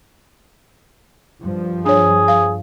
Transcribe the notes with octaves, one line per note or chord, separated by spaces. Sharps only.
G2 F3
D4 G#4 C#5
F5